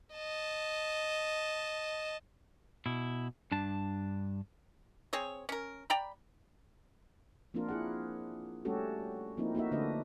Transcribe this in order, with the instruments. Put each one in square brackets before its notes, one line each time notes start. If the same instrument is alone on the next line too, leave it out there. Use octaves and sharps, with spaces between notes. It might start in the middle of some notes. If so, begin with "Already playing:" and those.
[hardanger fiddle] D#5 A5
[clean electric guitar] B2 E4
G2 D4 A5
[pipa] C4 G#4 C#5
C#4 A#4
D5 G5 A#5 B5
[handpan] F3 A#3 C4 D4 F4 A#4
E4 G#4 F#5
G3 A3 C#4 F#4 G4 A4
F3 A#3 C4 D#4 E4
A#3 D#4 F#4 E5
D3 A3 D4 F#4 B4 D#5